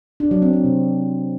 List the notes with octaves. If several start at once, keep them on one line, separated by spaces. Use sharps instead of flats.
D4
F#3
C4
C4
C3